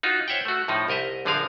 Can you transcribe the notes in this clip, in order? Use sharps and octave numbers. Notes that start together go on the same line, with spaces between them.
D#4 F4 F#4
C5 C#5 E5 F#5 G5
A3 F#4
A2 F3 D#4
C2 A#4 D#5 E5
A#1 D3 F3 G#4 A#4 F5